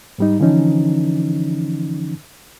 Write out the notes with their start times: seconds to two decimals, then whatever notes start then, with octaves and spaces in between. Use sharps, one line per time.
0.18 G#2 G3 D#4
0.40 D3 E3 F3 C#4 D#4